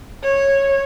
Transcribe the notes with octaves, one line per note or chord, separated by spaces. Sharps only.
C#5